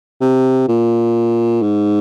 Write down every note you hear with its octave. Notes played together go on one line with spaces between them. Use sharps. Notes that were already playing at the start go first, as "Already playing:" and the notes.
C3
A#2
G#2